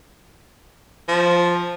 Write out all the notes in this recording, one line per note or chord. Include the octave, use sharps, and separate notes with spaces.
F3